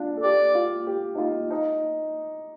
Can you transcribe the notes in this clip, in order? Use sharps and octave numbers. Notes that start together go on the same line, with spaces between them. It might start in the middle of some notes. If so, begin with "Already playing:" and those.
Already playing: D4 F4
A4
G4 D5
F4
G4
D#4
F4
D#4